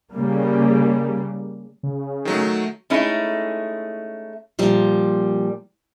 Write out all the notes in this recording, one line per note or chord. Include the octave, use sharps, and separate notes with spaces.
C#3 G3 A#3
C#3
D#3 F#3 A3
G#3 A3 C#4 D#4 E4
A#2 F3 G3